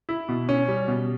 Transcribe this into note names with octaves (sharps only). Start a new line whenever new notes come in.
E4
B2
C#4
G3
B2